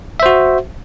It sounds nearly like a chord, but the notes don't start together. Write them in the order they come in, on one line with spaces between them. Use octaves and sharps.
E5 C5 F#4